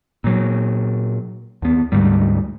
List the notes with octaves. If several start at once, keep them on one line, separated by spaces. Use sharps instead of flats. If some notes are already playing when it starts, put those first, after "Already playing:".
A#2 F#3
D#2 B3
D2 G#2 G3